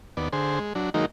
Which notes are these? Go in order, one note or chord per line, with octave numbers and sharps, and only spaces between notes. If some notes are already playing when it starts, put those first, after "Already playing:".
D#2 B3 D5
D3 G#4 C5
G#3
F#3 D4
D#3 F#3 G#3 A#3 D#4